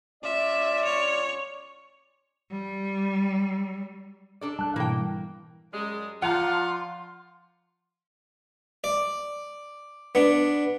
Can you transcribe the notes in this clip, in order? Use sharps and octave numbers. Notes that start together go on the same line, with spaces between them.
C#4 F4 D5 E5
C#5
G3
D4 A4 D5
G3 A5 F#6
G#2 B2 E3 A#3 G5
F#2 G3 G#3
F3 F4 D5 F5 F#5 A5 A#5 C6
D5
B3 D4